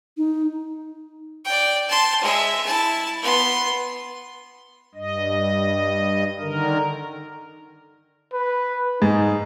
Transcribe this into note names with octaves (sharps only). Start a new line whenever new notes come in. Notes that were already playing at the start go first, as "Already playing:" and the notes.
D#4
D5 G5
A5 C6
G#3 E5
E4 A5
B3 C6
G2 D#5
D3 D#3 A#4
B4
G#2 D#4